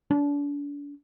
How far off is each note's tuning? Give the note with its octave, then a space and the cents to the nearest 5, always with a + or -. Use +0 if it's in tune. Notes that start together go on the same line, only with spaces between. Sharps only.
D4 -35